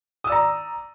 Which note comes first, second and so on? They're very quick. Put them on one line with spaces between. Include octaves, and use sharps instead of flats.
D#6 E6 D5 A#5